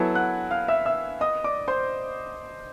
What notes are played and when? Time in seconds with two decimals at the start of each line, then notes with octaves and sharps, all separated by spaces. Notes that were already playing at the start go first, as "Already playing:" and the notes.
Already playing: F#3 B3 E4 A4 G#5 G#6
0.15 F#5 F#6
0.51 F5 F6
0.68 E5 E6
0.85 E5 E6
1.21 D#5 D#6
1.44 D5 D6
1.68 C5 C6